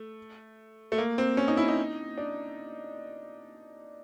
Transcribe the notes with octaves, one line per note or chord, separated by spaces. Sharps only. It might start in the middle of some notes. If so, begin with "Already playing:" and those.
Already playing: A3
A3
A#3
C4
C#4
D#4
E4
D#4
D4